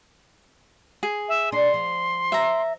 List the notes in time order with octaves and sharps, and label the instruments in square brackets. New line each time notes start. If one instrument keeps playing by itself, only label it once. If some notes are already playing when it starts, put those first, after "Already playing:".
[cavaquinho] G#4
[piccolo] E5
[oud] D4 [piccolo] C6
[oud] F3
[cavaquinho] E5 A#5